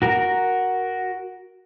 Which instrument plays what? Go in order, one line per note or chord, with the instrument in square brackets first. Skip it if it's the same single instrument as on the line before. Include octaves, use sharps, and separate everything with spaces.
[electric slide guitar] F#4 A#4